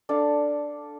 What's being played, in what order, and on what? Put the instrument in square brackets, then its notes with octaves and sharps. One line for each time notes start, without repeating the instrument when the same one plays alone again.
[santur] D4 A4 D5 F5